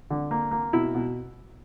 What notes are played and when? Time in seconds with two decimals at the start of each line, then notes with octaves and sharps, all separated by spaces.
0.10 D3
0.31 A#3
0.51 A#3
0.73 B2 E4
0.95 B2